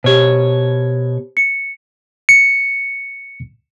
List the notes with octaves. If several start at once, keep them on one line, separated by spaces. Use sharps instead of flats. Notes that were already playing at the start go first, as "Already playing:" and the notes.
B2 G4 C5 C#5
C#7
C#7